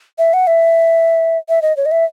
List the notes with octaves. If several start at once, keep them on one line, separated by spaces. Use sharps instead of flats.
E5
F#5
E5
E5
D#5
C#5
D#5
E5